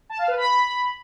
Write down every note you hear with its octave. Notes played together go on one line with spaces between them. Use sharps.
A5
F5
B4
B5